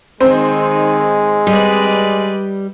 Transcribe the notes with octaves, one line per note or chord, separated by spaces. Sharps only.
D#3 G#3 C4 D#4 C5
G3 B4 D5 D#5